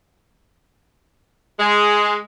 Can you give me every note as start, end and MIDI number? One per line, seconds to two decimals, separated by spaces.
1.60 2.16 56